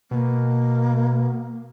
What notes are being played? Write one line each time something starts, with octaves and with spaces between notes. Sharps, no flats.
B2 A#3